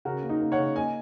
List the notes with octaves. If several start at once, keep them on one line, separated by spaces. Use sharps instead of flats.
C#3 F#4 A#4
A#3
D#4
A#3
C#5 F#5
C#3
A#3 D#5 G#5